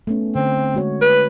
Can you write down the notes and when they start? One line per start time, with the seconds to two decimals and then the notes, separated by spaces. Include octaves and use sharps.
0.07 A3 B3 C#4
0.35 D3 C4
0.74 G#3 F#4 C#5
1.02 B4